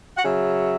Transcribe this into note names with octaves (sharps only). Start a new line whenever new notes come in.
F#5
C#3 F#3 E5